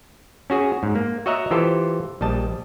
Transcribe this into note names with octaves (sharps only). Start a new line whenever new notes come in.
C#4 F#4 G#4
G#2
A#3
F#4 C#5 D#5 E5 F#5 A#5
E3 F4 G4 A4 C5
A#1 G3 D#5 A5